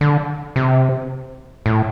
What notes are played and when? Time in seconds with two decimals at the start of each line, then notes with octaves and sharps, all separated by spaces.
0.01 D3
0.56 C3
1.66 A2